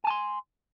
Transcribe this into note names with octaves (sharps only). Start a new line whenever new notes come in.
G#5 A5 C6